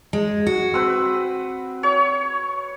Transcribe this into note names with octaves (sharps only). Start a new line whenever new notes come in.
G#3
F#4
C4 B4
C#5